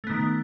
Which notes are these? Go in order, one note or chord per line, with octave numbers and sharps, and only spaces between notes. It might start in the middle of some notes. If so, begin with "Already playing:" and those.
D#3 A3 B3